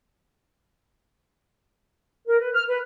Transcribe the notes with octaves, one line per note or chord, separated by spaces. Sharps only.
A#4
B4
F6
B4